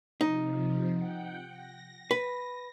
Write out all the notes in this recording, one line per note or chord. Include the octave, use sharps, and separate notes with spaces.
C3 F3 D#4
F#5 G5
A#6
B4